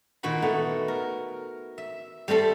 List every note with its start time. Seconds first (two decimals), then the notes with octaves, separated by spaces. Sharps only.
0.23 A#2 D#3 F#4 B5
0.42 A3 B3 D#4
0.88 A#4
1.78 E5
2.28 G3 A3 C4 A4